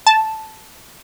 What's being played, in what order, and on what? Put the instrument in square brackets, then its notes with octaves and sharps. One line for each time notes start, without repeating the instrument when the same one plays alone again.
[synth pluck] A5